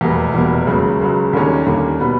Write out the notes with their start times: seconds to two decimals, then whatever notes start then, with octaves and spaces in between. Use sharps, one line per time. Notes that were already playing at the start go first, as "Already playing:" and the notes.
0.01 F1 E2 B2 G3 A#3
0.34 F1 E2 B2 G3 A#3
0.67 C#2 C#3 F#3
1.01 C#2 C#3 F#3
1.33 D#2 D3 G3 A#3 C#4
1.66 D#2 D3 G3 A#3 C#4
2.00 B2 G3 B3